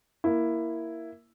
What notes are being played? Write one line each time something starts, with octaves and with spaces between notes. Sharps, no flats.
A#3 E4